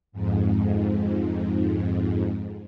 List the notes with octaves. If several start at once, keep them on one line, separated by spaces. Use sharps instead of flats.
F2 G#2